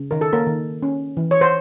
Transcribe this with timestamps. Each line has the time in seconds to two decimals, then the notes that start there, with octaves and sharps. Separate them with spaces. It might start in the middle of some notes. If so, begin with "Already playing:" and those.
Already playing: C#3
0.11 D#3 A#4
0.21 A4
0.33 A#3 A#4
0.47 D#3
0.83 C#4
1.17 E3
1.31 C#5
1.41 C5